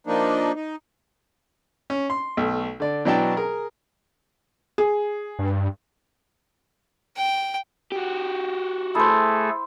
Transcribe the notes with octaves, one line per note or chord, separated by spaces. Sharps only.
F3 A#3 D4 D#4
D#4
C#4
C6
B1 A3
D3 D5
B2 E3 F#3 D4 G5 A5
G#4 A#4
G#4
G2
G5
F#4 G4
A3 E4 G#4 A4 C5